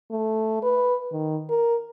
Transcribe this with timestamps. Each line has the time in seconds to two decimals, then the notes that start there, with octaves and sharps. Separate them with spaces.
0.11 A3
0.63 B4
1.12 D#3
1.49 A#4